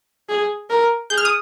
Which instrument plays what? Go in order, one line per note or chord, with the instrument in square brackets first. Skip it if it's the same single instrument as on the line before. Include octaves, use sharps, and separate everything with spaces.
[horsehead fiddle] G#4
A#4
[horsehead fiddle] G#4 [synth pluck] G6
[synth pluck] F6
D#6